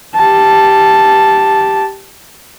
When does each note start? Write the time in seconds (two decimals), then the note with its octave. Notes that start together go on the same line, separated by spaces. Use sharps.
0.15 G4 A5